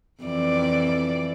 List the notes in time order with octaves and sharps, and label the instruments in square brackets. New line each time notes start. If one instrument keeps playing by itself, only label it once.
[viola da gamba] F2 E3 D5